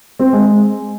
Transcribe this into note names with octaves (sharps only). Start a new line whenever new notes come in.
C4
G#3